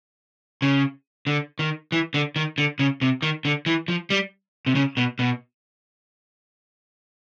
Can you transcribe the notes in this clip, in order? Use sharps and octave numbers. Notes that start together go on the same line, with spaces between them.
C#3
D3
D#3
E3
D3
D#3
D3
C#3
C3
D#3
D3
E3
F3
G3
C3
C#3
B2
B2